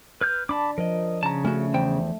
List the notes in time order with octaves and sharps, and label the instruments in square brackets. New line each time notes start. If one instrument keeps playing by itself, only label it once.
[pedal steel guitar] B4 F6 G6
[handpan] D4 [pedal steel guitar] A5 B5 D6
[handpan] F3 [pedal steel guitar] A#4 D#5
[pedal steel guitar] C#3 [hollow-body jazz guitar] A5 A#5
[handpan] A3 [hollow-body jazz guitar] C#4 F#4
[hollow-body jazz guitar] E2 C5 G5